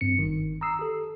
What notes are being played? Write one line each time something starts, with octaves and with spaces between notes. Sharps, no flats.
G2 C4 C#7
G1 D#3
A#5 D#6 E6 C7
G4 A4